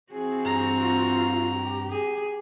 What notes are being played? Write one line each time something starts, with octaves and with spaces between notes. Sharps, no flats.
E3 C4 E4 F#4 G#4
G2 A#5
F4
G4
G#4